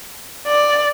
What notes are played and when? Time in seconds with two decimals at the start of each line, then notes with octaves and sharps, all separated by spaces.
0.47 D5